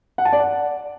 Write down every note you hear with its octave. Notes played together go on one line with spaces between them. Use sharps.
F#5
A5
D5
F#5